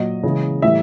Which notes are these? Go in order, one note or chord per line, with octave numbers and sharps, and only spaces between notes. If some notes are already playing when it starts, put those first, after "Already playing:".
Already playing: A#2 F#3 D#5
C#3 E3 G#3
A2 E3 G3 E5